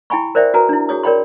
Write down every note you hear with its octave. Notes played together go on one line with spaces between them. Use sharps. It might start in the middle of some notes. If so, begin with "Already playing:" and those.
E4 G5 G#5 B5 C#6
A#4 C5 D5 E5 G5
F#4 A#4 B4 G#5 A#5
D4 E4
F#4 G#4 C#5 D#6
A#4 C#5 D5 G5 B5 C6